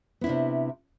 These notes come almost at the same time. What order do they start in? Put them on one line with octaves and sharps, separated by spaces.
B3 E4 D4 C3